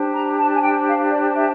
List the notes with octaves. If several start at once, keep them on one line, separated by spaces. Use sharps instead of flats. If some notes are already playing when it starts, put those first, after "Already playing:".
Already playing: D4 G4 C5
A#5
A5
G#5
G5
F5
D5
E5